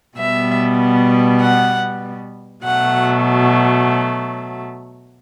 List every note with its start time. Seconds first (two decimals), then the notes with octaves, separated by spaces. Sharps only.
0.17 B2 G3 B3 E5
1.41 F#5
2.64 B2 F#3 A3 F#5